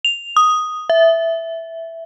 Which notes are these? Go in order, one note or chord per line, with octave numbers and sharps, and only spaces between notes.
F7
D#6
E5